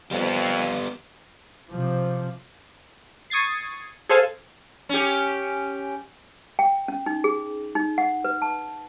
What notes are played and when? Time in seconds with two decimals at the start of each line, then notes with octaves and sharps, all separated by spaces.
0.11 F2 G3 B3
1.70 C3 F3
3.30 C#6 D#6 G#6 A6 C7
4.09 G#4 A4 C5 F5 G#5 G#6
4.89 C#4 G4
6.59 G5
6.88 C#4
7.06 D#4
7.24 G#4
7.75 D#4
7.98 F#5
8.25 B4
8.42 A5